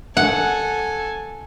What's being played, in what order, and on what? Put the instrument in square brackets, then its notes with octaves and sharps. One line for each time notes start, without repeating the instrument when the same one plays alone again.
[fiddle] A4 G#5 [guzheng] F#5